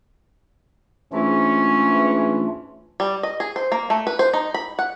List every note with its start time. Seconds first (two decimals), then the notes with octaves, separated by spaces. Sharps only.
1.13 G#2 E3 A3 C#4 D4 F4
3.00 G3
3.23 D#5
3.40 G#4
3.56 C5
3.72 A#3
3.90 A3
4.07 B4
4.19 C5
4.33 D#4
4.54 B5
4.79 F#5